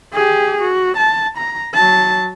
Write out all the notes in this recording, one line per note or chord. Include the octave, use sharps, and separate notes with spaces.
G4 G#4
F#4
A5
A#5
F#3 A5